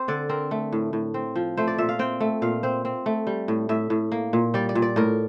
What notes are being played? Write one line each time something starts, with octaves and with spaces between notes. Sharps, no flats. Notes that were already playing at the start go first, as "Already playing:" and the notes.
Already playing: C4 C5
D3 D5
C4 A#4
A3
A2
A2
C4
F3
A3 C5
D5
A#2 E5
F5
C4 G5
A3
A#2 F5
C4 C5
C4
A3
G3
A2
A2 E5
A2
A#3
A#2
G3 D5
D5
A#2
D5
A2 A#4